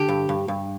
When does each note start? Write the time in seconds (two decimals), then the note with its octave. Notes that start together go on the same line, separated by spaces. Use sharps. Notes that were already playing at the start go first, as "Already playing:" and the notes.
Already playing: D3 G4
0.09 G2
0.29 G2
0.48 G2